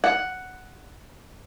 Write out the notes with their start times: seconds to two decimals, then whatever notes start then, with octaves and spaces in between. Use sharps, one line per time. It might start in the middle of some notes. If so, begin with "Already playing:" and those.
0.04 F#5